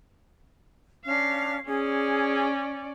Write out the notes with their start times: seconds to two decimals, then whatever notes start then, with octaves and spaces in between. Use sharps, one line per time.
1.05 C#4 D4 F5
1.66 C#4 G#4 D5